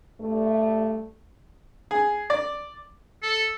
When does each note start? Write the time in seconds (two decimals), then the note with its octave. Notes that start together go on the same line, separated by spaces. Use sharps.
0.20 G2 A3
1.91 G#4
2.30 D5
3.23 A4